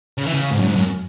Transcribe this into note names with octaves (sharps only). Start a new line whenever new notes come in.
C#3
E3
C#3
G#2
F#2
G#2
F#2